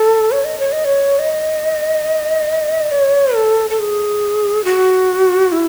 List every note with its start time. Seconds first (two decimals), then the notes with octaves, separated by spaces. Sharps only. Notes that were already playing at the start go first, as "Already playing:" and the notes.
Already playing: A4
0.32 C#5
0.45 D#5
0.59 C#5
0.72 D#5
0.85 C#5
1.19 D#5
2.91 C#5
3.35 A4
3.70 A4
3.79 G#4
4.65 F#4
5.52 E4